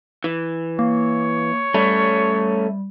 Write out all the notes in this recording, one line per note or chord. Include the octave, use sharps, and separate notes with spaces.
E3
A#3 C#5
G3 A3 C#4